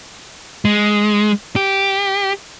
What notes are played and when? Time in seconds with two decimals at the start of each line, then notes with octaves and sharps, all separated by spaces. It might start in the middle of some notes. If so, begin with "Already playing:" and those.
0.65 G#3
1.56 G4